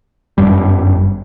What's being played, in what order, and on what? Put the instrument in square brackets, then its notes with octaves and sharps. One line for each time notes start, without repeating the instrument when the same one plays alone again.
[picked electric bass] G1 F#2 G3